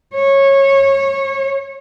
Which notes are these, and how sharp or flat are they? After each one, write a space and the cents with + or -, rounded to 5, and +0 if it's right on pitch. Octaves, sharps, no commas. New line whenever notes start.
C#5 -20